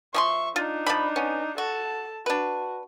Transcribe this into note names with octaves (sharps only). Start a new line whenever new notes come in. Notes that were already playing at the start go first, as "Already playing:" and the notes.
F3 G#4 E5 C6 C#6
D4 D#4 F4
F3 D5 B5
B3 C#4
F#4 A4 A5
D4 F#4 B4